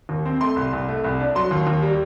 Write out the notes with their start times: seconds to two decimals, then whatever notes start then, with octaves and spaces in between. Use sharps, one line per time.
0.09 D#2
0.25 C4
0.41 A3 C6
0.56 C2
0.73 C2
0.89 A3
1.04 C2
1.20 D4
1.35 F#3 C6
1.51 D#2
1.67 D#2
1.82 G3